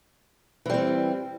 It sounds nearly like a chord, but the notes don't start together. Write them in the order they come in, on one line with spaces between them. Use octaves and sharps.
E3 G3 C4